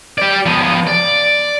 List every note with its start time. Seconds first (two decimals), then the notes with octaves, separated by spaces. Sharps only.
0.18 G4 D5
0.46 F3 B3
0.87 D5